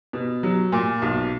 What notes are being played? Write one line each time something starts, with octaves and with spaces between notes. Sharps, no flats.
B2
F#3
A#2
B1